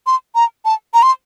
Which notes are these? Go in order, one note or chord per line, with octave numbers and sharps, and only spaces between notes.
C6
A#5
A5
A#5
C6